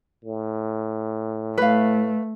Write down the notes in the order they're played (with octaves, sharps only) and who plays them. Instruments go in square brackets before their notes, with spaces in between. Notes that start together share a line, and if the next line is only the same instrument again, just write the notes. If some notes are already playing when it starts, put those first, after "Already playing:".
[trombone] A2
[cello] A3 [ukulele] B4 F5